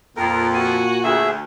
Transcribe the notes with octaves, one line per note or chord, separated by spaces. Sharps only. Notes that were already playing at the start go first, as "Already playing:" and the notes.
F2 A#2 A#4
F#4 G#5
D2 G#4 E5